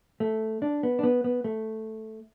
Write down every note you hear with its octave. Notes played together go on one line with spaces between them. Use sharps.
A3
D4
B3
D4
B3
B3
A3